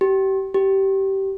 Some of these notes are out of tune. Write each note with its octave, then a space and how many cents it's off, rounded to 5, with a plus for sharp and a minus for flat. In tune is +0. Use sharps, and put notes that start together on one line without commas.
G4 -30
G4 -20